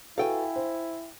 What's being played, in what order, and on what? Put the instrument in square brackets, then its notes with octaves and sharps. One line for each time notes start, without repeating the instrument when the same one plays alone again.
[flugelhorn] E4 [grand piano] F#4 A4 B4 [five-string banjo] F5 G5 G#5
[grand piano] C5